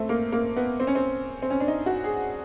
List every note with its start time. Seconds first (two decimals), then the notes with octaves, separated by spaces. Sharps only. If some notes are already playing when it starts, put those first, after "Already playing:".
Already playing: A3 C4
0.09 A#3
0.32 A#3
0.56 B3
0.80 C4
0.87 C#4
0.95 C4
1.42 C4
1.50 C#4
1.60 D4
1.68 D#4
1.86 F#4
2.04 G#4